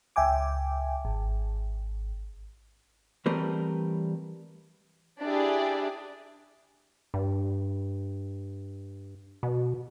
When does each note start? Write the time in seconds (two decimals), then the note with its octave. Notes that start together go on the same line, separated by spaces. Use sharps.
0.16 C#2 E5 G5 G#5 D6
1.05 G#1
3.26 E3 G3 A3 C4 A#4 B4
5.21 D4 E4 G4 G#4 D5
7.14 G2
9.43 B2